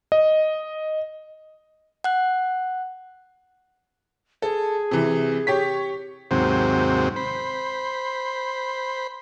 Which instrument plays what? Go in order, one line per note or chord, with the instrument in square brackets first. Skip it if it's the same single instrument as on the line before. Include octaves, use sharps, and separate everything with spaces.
[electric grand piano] D#5
[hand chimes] F#5 F#6
[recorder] G#4 [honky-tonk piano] A4
[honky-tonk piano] C3 E3
G4 C#5 B6
[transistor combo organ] D#2 G#2 C3 F#3 C4
C5 B5